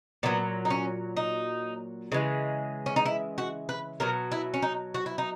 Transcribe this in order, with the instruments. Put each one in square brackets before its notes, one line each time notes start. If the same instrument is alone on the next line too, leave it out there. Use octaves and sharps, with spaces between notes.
[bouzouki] A#2 F#3 B3
D#4
C#4
D#4
C#3 E3 G#3
C#4
D#4
E4
F#4
B4
B2 F#3 A#4
E4
C#4
D#4
F#4
E4
D#4